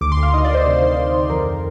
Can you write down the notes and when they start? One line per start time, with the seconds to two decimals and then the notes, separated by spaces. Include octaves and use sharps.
0.01 D2 D6
0.12 C6
0.17 D2
0.23 F5
0.33 D#3 D#5
0.45 D5
0.50 D#3 C5
0.65 C3
0.82 D#3
0.97 D#3
1.14 D#3
1.30 F2 A#4
1.46 D#3